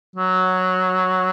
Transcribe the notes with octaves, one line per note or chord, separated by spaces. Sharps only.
F#3